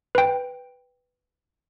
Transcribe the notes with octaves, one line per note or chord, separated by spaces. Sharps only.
B4 G5